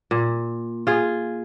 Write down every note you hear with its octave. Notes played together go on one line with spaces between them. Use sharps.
A#2
F4 G#4